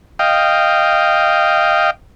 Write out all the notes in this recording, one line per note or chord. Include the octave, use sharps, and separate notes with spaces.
D#5 F5 G5